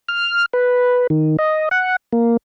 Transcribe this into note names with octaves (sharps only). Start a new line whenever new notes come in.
F6
B4
D#3
D#5
F#5
A#3